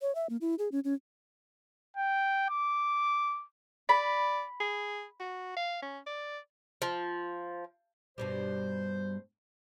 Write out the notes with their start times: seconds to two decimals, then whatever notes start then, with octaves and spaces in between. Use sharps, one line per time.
0.02 C#5
0.15 E5
0.30 A#3
0.41 E4
0.59 G#4
0.72 C#4
0.84 C#4
1.97 G5
2.49 D6
3.89 D5 B5
4.60 G#4
5.20 F#4
5.56 F5
5.82 C#4
6.07 D5
6.82 F3
8.18 G2 B2 G3 C5